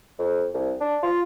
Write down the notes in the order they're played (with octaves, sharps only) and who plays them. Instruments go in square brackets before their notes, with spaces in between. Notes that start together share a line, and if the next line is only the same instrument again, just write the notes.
[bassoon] F2
C2
D4
F4